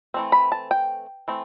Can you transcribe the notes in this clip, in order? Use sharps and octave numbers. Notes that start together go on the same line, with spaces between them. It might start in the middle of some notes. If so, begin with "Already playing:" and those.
E3 A3 C4
B5
A5
G5
E3 A3 C4